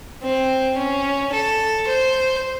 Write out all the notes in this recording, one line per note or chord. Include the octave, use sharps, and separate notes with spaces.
C4
C#4
A4
C5